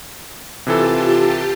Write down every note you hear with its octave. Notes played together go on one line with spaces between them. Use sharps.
C3 E3 F4 G4 A4 A5